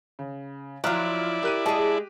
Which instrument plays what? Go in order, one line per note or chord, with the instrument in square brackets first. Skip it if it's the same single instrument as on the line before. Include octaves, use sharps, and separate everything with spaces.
[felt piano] C#3
[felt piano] F3 F6 F#6 [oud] F#3 F4 [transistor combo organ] E4 D5 [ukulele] A#5
[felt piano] G4 F#6 D#7 [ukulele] A#4
[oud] G#3 G#4 [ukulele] A5